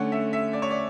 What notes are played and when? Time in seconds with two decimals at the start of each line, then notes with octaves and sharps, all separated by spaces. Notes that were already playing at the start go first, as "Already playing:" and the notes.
Already playing: D3 A3 C#4 F#5
0.12 E5
0.33 E5
0.53 D5
0.62 C#5
0.71 D5